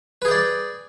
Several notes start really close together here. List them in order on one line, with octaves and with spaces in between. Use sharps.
B4 G#4 G5 D5